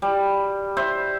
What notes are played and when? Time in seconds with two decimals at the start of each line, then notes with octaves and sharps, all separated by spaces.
0.02 G3
0.77 C5 E5